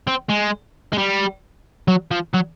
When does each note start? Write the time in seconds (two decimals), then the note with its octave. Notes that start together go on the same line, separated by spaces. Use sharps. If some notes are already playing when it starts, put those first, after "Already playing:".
0.07 C4
0.29 G#3
0.93 G#3
0.98 G3
1.88 F#3
2.11 F3
2.34 F#3